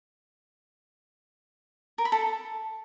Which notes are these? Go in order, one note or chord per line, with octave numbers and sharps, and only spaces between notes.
A#4
B5
A4